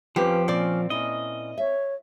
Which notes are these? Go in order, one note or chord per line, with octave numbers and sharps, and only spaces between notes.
F2 F3 C4 C#4 F4 G4 B4
A#2 C4 C#4 D5
A#2 C#4 E4 D#5
C#5 E5